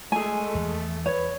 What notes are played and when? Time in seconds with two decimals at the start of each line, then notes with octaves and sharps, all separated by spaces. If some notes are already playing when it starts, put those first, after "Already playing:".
0.12 G#3 A3 G#4 G#5
0.55 E2 E3 F3
1.06 B4 C#5